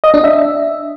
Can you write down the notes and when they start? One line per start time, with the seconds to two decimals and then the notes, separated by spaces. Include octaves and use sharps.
0.04 D#5
0.14 D4
0.24 E5